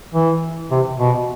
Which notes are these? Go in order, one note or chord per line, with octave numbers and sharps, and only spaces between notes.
E3
C3
B2